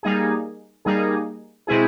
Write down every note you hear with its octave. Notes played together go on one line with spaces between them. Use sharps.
G3 A#3 D#4 G#4
G3 A#3 D#4 G#4
B2 G#3 C4 E4 G#4